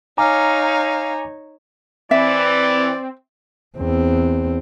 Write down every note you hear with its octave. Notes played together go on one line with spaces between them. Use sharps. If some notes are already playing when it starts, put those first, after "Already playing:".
D#4 C#5 F5 G#5 A#5 D6
E3 C4 D5 E5
E2 C4